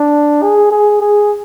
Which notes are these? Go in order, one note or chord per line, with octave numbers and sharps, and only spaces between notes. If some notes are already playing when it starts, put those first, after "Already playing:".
Already playing: D4
G#4
G#4
G#4